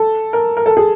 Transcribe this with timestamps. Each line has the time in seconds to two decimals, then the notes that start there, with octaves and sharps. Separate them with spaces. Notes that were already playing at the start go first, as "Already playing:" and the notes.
Already playing: A4
0.33 A#4
0.57 A#4
0.66 A4
0.77 G#4